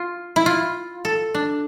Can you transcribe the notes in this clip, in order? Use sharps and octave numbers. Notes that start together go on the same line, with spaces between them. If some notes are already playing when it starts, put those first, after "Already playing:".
Already playing: F4
E4
F4
A4
D4